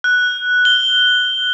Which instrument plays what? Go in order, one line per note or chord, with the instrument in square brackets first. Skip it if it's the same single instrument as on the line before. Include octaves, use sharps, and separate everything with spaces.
[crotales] F#6
G7